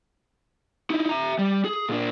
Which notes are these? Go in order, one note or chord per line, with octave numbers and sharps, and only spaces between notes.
D#4 E4
E5 A#5
G3
G#4
A#2 D4